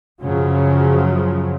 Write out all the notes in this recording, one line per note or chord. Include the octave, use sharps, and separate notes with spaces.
F#2 C#3 F3 F#3